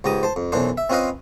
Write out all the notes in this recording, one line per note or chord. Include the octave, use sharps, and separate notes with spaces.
C#2 G#2 G4 A#5 D#6
C5 A5
F2
B1 F#2 E3 D4 C5
E5
C4 C#4 F4 B4 D#5 F5